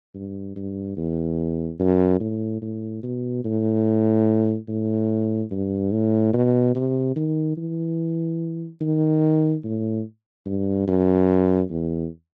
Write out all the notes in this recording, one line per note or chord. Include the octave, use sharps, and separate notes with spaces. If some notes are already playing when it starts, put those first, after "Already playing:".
G2
G2
E2
F#2
A2
A2
B2
A2
A2
G2
A2
B2
C3
D#3
E3
D#3
A2
G2
F#2
E2